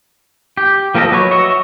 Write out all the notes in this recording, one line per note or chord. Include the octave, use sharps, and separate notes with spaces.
G4
F3 A#3 G4 A4 D#5
F#3 B4 C#5
F#4 C#5 D#5 E5